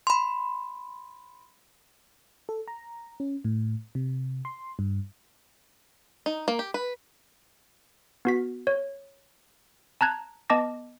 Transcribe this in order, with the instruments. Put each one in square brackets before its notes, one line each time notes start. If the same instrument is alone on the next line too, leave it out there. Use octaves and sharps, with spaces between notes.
[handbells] B5 C6
[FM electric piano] A4
A#5
C#4
A2
C3
C6
G2
[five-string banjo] D#4
A#3
G4
B4
[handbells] B3 F#4 B6
C#5
A5 A#5 F#6 G#6
B3 D#5 A5 D6 A#6